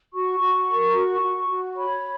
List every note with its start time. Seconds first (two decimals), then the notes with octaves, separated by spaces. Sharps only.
0.13 F#4 C#6
0.41 F#4
0.68 A#4
0.94 F#4
1.22 F#4
1.49 F#4
1.76 C#5 B5